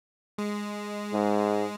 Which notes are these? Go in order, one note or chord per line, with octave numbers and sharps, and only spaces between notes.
G#3
G#2